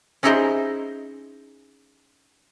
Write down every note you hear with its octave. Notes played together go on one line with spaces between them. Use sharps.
C#4 D#4 E4 G#4 C5 D#5